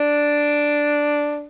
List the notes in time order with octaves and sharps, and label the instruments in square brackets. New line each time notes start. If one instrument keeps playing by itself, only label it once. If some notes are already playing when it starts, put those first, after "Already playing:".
Already playing: [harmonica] D4